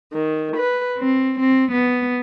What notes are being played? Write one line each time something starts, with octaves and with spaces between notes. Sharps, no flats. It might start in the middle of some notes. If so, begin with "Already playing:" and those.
D#3
B4
C4
C4
B3